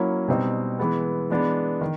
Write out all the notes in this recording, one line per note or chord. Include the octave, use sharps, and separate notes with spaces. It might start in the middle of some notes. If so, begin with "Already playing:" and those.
Already playing: F#3 A#3 C#4 E4
B2 G3 C4 D#4
E3 G#3 B3
E3 G#3 B3 D4
D#3